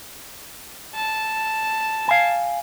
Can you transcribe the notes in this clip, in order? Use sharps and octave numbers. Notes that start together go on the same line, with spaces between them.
A5
F5 G#5